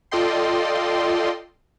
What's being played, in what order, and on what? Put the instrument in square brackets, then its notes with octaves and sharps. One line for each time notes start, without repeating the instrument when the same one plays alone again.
[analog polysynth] F4 A4 D5 D#5 G5 C6